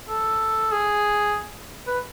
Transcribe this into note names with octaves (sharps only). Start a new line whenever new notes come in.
A4
G#4
B4